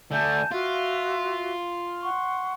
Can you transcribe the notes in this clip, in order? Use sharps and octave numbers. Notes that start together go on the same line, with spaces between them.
D3 A3 G#5 A5 G6
F4 F#4 E5
F#5 C6 C#6